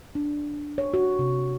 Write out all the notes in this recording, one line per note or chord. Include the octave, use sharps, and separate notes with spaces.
D4
C#5
F#4
C3